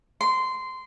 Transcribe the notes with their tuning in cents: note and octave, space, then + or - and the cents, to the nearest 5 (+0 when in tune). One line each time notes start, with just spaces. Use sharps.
C6 -15